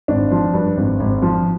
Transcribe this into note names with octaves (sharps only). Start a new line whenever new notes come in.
G#1 D4
F3
G2
G#1
G#1
F3